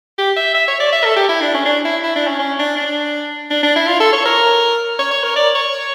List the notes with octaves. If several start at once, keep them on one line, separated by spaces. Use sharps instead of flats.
G4
E5
E5
C#5
D5
E5
A4
G4
E4
D4
C#4
D4
E4
E4
D4
C#4
C#4
D4
D4
D4
D4
E4
F4
A4
C#5
A#4
C#5
C#5
A#4
D5
C#5